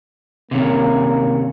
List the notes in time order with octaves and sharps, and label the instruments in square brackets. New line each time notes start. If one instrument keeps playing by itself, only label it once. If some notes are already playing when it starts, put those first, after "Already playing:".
[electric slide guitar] C3 D#3 C#4 [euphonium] A#3